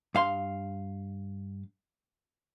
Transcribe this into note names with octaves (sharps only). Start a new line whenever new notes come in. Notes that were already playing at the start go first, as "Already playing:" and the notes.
G2 F5 C6